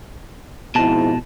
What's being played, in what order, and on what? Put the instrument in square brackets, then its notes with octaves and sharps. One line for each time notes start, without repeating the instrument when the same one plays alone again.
[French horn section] F2 G#2 E4 [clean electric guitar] B2 A5